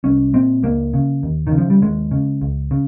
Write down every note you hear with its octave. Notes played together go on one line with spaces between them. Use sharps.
C2 C#4
A#2 C4
C#2 A#3
C#3
D#2
D#3
C#3
F3
G3
D#2 G#3
C#3
C#2
C#3